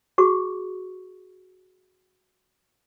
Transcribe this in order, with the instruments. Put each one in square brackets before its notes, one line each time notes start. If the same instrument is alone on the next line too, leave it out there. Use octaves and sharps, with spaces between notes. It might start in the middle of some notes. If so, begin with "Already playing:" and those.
[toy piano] F#4 G#4 C#6